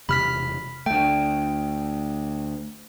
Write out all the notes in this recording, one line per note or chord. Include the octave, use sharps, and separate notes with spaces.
E1 C3 B5 F6 B6
D2 A3 G5